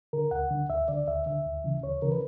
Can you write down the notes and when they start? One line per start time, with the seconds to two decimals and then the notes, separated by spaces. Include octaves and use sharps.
0.13 D3 A#4
0.31 D2 F#5
0.51 D3
0.70 D2 E5
0.88 D3 D5
1.08 D2 E5
1.26 D3 E5
1.46 D2
1.64 C#3 E3
1.83 D2 C#5
2.02 C#3 E3 A#4
2.12 B4